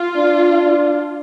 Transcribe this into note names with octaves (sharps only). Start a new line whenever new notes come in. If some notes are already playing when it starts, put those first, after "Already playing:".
Already playing: F4
D4
D4